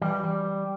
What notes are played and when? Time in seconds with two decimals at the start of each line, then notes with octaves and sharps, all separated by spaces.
0.02 E3 G3
0.24 G3